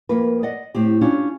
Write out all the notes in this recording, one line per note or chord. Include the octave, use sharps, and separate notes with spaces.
F2 A#3 B4
D5 D#5 F#5
A2 C4 G4
C#4 D4 E4 F4 G4